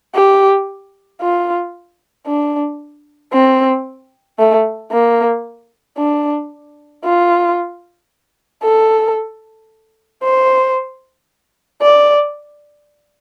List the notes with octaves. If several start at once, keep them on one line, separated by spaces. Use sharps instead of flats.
G4
F4
D4
C4
A3
A#3
D4
F4
A4
C5
D5